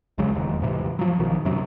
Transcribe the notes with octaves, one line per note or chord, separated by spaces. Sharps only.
B1 C#3 F#3 G#3
E1 D#2
D#1 G#2 C3 E3
F3 F#3
B1 B2 D#3
F#2 C3 F#3